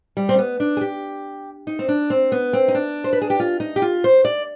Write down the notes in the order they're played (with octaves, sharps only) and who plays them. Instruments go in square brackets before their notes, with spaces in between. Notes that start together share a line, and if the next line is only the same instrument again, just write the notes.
[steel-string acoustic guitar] G3
C4
B3
D4
G#4
G4
D#4
C4
D4
C4
B3
C4
D#4
D4
C5
B4
G#4
G4
F4
D#4
G4
F4
C5
D5